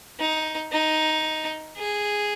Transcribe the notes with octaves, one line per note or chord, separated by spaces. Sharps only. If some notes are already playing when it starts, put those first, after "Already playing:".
D#4
D#4
G#4